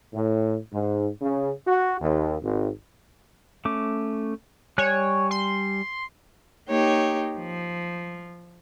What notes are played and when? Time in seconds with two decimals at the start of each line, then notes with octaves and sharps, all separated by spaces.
0.14 A2
0.73 G#2
1.21 C#3
1.67 F#4
2.01 D#2
2.42 G#1
3.65 A3 C#4 D6
4.78 G3 C#5 G#5 F#6
5.31 C6
6.69 A#3 D#4 G4 C#5
7.38 F3